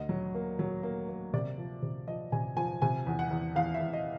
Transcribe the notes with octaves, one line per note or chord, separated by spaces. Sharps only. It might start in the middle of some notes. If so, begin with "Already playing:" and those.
Already playing: D2 D#5
F#3
A#3
F#3
A#3
A#3
C3 D5
F3
C3
F3 D#5
C3 G#5
F3 G#5
C3 G#5
E2
F#5
E2
E2 F5
E5
E2
D#5